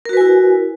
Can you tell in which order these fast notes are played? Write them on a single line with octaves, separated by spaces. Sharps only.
A#4 F#4 B4 G#5 E4